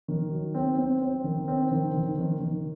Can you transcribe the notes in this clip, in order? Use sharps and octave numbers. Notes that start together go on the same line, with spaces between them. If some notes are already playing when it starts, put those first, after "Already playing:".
D#3
F#3
C4
C4
C4
D#3
C4
D#3
D#3
D#3
D#3